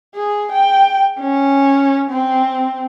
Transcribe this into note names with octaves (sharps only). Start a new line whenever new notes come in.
G#4
G5
C#4
C4